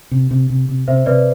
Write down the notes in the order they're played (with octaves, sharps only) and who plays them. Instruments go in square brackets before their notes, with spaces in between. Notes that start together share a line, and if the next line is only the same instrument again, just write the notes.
[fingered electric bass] C3
C3
C3
C3
[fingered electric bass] C3 [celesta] C5 E5
[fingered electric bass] C3 [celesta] B4 D5